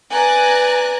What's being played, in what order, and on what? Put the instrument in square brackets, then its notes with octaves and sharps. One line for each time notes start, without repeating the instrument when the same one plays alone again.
[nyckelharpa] B4 D5 [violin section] G#5 A#5 F#6